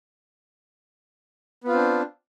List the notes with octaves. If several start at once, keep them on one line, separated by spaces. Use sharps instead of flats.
B3 C4 D4 F4